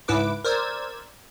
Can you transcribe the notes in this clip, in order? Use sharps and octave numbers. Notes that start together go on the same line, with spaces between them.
C#2 G#2 E4 B4 D6 D7
A#4 C5 D5 E6 G#6